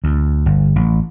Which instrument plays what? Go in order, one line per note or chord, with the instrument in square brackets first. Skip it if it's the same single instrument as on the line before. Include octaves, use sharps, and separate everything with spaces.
[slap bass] D2
G1
A1